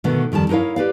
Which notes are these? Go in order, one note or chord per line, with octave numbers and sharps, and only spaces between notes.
B2 D3 D#3 A3 B3
F2 D#3 G3 A5
D#4 E4 A#4 C#5 F5
G4 B4 D5 F5